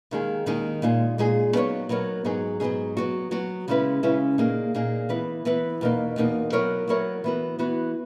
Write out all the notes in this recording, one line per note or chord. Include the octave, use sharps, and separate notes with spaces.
D#2 D#3 G#3 D#4 G#4
D#2 D#3 G#3 D#4 G#4
A#2 G#3 D#4 G#4
A#2 G#3 D#4 G#4
F#3 B3 D#4 A#4 C#5
F#3 B3 D#4 A#4 C#5
G#2 F#3 B3 D#4 G#4
G#2 F#3 B3 D#4 G#4
F#3 B3 F#4
F#3 B3 F#4
C#3 G#3 C#4 E4 B4
C#3 G#3 C#4 E4 B4
A#2 A#3 D#4 G#4
A#2 A#3 D#4 G#4
E3 B3 E4 B4
E3 B3 E4 B4
E2 B2 A#3 D#4
E2 B2 A#3 D#4
F#3 B3 E4 A#4 C#5
F#3 B3 E4 A#4 C#5
E3 B3 F#4
E3 B3 F#4